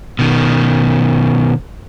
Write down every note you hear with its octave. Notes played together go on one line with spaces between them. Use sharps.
B2 D#3